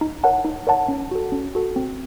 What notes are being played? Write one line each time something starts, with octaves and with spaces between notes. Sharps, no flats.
D#4
A#4 C#5 F#5 A5
D#4
A#4 C#5 F#5 A5
C#4
F#4 A4
C#4
F#4 A4
C4